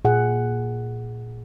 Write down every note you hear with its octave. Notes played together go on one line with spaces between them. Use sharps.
A#2 G#4 F#5